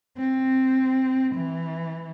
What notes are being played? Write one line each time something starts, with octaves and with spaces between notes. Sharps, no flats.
C4
E3